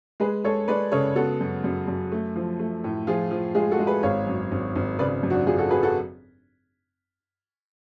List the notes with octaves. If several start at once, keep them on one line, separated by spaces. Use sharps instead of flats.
G#3 G#4 B4
G#3 A4 C#5
G#3 B4 D5
C#3 A4 C#5
B3 F#4 A4
F#2
F#2
F#2
A3
F3
A3
A2
F3 F4 G#4
F3
G#3 F4 G#4
F#4 A4
G#3
G#4 B4
G#1 C#5 F5
F#2
G#1
G#1
C#3 B4 D5
F#2
D4 F#4
F#2 F4 G#4
F#4 A4
F#3 G#4 B4
F#4 A4